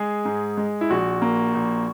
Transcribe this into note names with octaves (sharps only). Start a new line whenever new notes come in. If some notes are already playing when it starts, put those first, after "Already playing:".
Already playing: G#3 G#4
G#2
G#3
E4
A#1 F#4
A#3
A#1